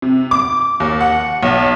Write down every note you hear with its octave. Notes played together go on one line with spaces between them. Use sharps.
C3
D6
D#2
F#5
B1